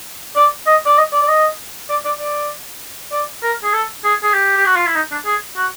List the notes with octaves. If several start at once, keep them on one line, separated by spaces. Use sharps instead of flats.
D5
D#5
D5
D#5
D5
D5
D#5
D5
D5
D5
D5
A#4
G#4
A4
G#4
G#4
G4
G4
F#4
F4
E4
D#4
D4
G#4
F#4